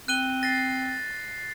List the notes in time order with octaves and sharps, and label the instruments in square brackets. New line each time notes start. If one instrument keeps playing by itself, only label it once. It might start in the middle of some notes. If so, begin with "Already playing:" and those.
[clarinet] C4 [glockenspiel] F#6 D#7 G7
[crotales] A6 C7 [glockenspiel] A#6